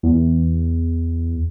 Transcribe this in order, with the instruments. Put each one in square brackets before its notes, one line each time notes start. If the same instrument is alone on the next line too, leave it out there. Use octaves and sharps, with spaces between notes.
[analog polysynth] E2